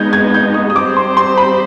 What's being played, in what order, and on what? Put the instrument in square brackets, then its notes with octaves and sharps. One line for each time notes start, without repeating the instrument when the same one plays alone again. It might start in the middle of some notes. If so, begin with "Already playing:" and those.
Already playing: [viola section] G#3 B3 D#4 [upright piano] G6 G#6
[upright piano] G#6
G6
D#6
D#6
[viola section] G3 C4 G4 C5 [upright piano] D6
[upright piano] C6
C6
B5